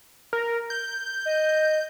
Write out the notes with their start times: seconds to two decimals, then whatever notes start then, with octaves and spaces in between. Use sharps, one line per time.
0.33 A#4
0.70 G6
1.26 D#5